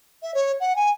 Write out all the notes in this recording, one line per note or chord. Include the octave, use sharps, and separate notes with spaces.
E5
C#5
F#5
G#5